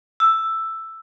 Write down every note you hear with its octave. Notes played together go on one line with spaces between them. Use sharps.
E6